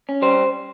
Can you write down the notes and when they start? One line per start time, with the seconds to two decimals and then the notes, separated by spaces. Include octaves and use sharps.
0.09 C#4
0.22 G3 C5